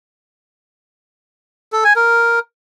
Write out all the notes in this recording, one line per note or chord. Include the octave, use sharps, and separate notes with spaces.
A4
G#5
A#4